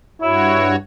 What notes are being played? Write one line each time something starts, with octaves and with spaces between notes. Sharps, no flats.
G2 E4 F#4 C#5